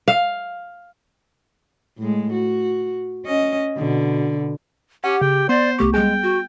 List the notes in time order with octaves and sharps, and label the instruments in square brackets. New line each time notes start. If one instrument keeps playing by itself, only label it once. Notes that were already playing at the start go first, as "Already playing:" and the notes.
[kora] F5
[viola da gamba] A2 G#3
F#4
C#4 D#5
B2 D3
[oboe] C#4 [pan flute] G4 [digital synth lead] F#5
[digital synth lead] C#3 [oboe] G5
[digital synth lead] B3 [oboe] C5 [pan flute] D5 [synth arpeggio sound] C6
[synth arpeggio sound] C2 A3 C#6 [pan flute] G4
[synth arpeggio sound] G3 G#4 [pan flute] G#3 [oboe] G5
[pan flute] F#4